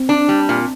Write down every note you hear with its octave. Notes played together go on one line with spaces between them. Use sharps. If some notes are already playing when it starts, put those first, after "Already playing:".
Already playing: C4
D4
G3
A#2